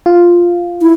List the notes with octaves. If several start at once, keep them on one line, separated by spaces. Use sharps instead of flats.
F4
E4